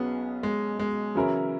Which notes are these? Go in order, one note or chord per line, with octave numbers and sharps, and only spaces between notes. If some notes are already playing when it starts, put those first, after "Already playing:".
Already playing: B1 B2 F#3 B3 C#4 G#4
G#3
G#3
C#3 E3 F#3 C#4 E4 A#4